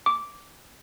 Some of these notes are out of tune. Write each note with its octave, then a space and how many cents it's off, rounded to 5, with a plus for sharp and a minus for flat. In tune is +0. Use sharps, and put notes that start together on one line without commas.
D6 -10